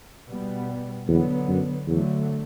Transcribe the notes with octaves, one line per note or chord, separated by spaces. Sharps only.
B2 G3 B3
E2 D3 F#3 B3
F#2
E2 D3 F#3 A3